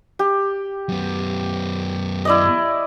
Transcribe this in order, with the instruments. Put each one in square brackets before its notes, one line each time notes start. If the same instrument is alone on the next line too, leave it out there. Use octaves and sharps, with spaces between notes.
[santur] G4
[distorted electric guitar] F#2 B3
[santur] E4 D5 D#5